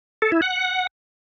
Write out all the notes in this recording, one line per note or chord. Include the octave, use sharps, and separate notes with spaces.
A4
E4
F#5